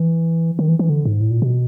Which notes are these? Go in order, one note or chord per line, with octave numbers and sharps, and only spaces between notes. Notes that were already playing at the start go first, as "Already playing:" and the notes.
Already playing: E3
D#3
E3
E3
D3
G#2
A2
A#2
B2